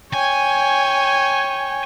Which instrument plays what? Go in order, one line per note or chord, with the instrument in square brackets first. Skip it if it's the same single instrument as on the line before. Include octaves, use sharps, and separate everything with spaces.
[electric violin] C#5 G5 [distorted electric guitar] G#5